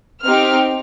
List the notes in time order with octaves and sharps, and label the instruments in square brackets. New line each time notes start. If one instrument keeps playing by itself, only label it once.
[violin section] C4 D#4 G4 F6